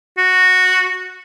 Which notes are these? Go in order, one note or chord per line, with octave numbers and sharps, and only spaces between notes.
F#4